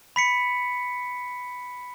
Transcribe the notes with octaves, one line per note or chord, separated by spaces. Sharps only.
B5 B6 C#7